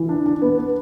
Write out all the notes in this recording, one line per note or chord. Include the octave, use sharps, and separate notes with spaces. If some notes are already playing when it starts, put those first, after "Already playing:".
Already playing: E3
D4
D4
B3
B3